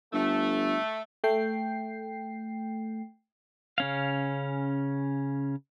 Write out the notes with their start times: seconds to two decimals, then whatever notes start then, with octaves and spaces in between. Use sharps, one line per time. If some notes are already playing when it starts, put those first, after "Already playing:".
0.13 G1 A3
1.24 A3 G5 C7
3.78 C#3 C#4 F5